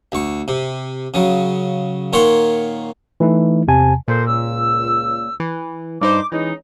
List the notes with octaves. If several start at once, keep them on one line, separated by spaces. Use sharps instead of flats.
D2 C#6
C3
C#3 F#3
A#2 D#3 C#5 F#5 C6
E3 A3 D#4 E4
E2 C3 G#5 A5
A#2 A4 A#4 C5
C#2 E6
E3
G2 D#4 C5 D6
E3 G#3 C#4 D#4